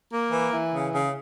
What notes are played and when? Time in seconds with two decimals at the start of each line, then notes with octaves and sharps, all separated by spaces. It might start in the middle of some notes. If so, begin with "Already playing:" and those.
0.12 A#3
0.32 E3
0.53 E3
0.73 C#3
0.94 C#3